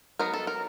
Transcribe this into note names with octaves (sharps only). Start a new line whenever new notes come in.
F#3 B3 D#4 A#4
A4
A#4